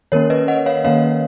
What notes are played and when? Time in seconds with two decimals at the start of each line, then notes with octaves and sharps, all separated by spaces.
0.12 D#3 A#3 C#4 A#4 C#5
0.30 B4 D#5
0.48 D#5 F#5
0.66 C#5 F5
0.84 D#3 A#3 C#4 C#5 F5